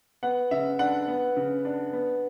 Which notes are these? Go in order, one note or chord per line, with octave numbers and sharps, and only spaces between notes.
B3 F#5
C#3 E5
D4 F#5
B3
C#3
D4
B3